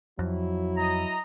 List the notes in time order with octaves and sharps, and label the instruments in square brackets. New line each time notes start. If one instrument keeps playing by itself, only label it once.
[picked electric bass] F2 [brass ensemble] F#3 E4
[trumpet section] D#5 A#5